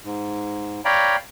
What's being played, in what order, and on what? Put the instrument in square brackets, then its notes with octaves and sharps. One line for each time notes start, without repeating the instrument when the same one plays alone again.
[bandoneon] G#2
C#5 D5 F5 G5 A#5 B5